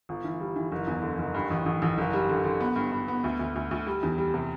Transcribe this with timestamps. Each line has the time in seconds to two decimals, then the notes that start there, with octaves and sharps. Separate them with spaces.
0.09 G1
0.24 E3
0.40 G3
0.56 E3
0.72 F#1
0.87 E2
1.03 D3
1.19 F#1
1.34 G2
1.50 A1
1.66 A1
1.82 A1
1.98 F#1
2.13 G3
2.29 D3
2.45 D3
2.60 B3
2.76 G2
2.92 G2
3.08 B3
3.24 D2
3.39 D2
3.56 D2
3.71 D2
3.87 G3
4.03 E2
4.18 G3
4.34 C3